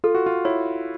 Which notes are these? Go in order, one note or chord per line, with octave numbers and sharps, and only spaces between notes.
F4 A4
F#4
F4
E4 C#5